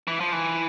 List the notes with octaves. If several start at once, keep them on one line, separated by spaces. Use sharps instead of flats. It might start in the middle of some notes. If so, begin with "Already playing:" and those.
E3
F3
E3